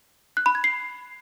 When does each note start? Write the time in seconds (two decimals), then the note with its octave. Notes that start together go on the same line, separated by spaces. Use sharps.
0.37 F#6
0.46 B5
0.55 G#6
0.64 C7